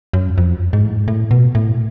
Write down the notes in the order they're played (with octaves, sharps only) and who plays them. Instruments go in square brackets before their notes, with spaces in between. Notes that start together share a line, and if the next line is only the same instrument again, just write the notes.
[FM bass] F#2
F2
G#2
A2
G#2
A2
B2
A2